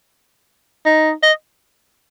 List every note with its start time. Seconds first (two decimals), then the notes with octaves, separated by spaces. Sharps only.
0.86 D#4
1.23 D#5